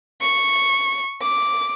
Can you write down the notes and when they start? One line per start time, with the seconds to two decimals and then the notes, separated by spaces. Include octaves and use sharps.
0.21 C#6
1.21 D6